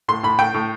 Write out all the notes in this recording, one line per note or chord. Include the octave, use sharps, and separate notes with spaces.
A2 C6
A2 B5
A2 G5
A2